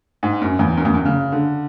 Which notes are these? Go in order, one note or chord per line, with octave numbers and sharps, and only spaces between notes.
G#2
F#2
E2
F#2
E2
F#2
C#3
D3